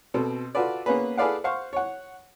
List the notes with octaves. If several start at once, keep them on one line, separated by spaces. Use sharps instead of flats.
B2 C4 A4
F4 F#4 A4 B4 D5
A#3 B3 C#4 G#4 B4
G#4 A4 B4 D5 F5 F#5
C5 F5 F#5 C#6
C#5 F#5